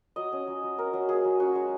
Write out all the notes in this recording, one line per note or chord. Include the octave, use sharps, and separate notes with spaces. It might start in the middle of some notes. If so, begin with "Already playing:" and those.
F#3 D#5
C#4
F#3
F#3
C#4 A#4
F#3
A#3 G#4
F#3
C#4 F#4
G#3